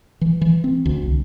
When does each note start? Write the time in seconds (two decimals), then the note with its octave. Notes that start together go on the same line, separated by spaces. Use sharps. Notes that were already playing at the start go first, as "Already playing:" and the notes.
0.21 E3
0.41 E3
0.64 C4
0.86 D2
1.03 C2